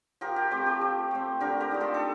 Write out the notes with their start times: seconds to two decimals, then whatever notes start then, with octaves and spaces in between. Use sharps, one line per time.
0.21 F3 G4 A#4
0.36 G4
0.51 A3 C4 G4
0.66 G4
0.81 F3
1.11 A3 C4
1.40 D3 G4 A#4
1.60 G4 A#4
1.71 A3 D#4
1.80 F4 A4
1.94 A4